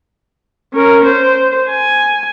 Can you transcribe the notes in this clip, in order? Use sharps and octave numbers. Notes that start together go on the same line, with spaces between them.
C#4 A#4
C5
G#5